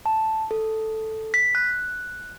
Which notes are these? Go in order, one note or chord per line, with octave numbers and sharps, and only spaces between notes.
A5
A4
B6
F#6